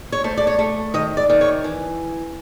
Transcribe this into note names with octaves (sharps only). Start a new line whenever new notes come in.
C#5
A3 C5
D5
C#5
A3
D#3 D#5
D5
D#3
C#5
E3